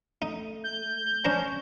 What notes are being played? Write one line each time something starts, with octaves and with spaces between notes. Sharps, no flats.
A3 D#4
G6
C#4 D4 C5 A#5